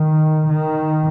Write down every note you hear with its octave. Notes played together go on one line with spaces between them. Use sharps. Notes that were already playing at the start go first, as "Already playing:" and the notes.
Already playing: D#3
D#3